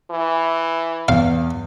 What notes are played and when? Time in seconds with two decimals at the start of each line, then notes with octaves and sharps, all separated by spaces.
0.11 E3
1.08 E2 F5